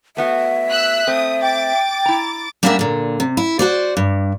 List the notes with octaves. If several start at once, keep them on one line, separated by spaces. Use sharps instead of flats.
A3 B3 F#4 E5
E6 F#6 B6
A3 C4 D#6
G5 D6 A6
E4 A#5
G3 A#3 D4 F#4 A#4 E5
A#2 D3
C3
E4
F#4 C5 D5
G2